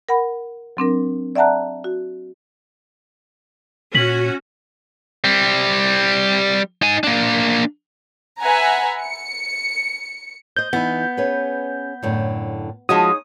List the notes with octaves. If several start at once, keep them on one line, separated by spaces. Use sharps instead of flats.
A#4 F#5 B5
F#3 C4 D4 A#4
D5 E5 F#5 A5 A#5 F#6
F#4
A#2 C#4 F#4 B6 F#7
G3 C4
D#4 G#5
A#3 D4
B4 E5 F#5 G#5 A#5
C#7
C5 D#5 G6
E3 B3 D#4
C#4 G#4 B4
F#2 A2 D3
F3 G#3 D#4 F#4 G#4 C#5 D#6